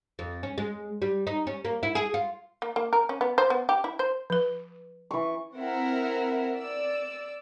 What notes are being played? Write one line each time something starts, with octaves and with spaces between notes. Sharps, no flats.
F2
C#4
G#3
G3
D#4
C#4
A#3
E4
G#4
F4
A#3
A#3
A#4
C#4
B3
C5
B3
G4
E4
C5
F3 B4
E3 C#6
C4 E4 A#4 E5 F#5
D5 E6